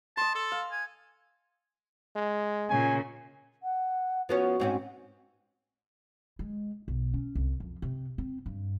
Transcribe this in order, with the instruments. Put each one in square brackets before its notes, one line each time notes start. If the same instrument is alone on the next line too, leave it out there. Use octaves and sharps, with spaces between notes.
[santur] D#5 C6 [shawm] A5
[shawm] A4
[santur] F5
[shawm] G#5
[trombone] G#3
[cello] A#2 C#3 [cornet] G#5
[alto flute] F#5
[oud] F3 B3 C#4 [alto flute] F#4
[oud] G#2 C4 C#4
[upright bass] G#3
B1
C#4
C2
F2
C3
C4
G2